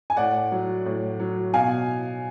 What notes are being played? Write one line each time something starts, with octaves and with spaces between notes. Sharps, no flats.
G#5
A2 D5 F#5
F#3
A2
F#3
B2 F5 G#5